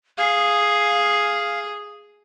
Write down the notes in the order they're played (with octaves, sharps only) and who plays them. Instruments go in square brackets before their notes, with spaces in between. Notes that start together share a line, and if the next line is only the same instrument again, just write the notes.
[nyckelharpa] G#4 [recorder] F5